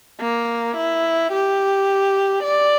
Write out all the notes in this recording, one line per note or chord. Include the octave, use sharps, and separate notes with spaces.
A#3
E4
G4
D5